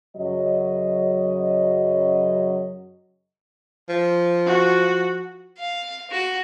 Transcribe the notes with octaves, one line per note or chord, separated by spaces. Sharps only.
F#2 C#3 F#3 D#5
F3
F#4
F5
F#4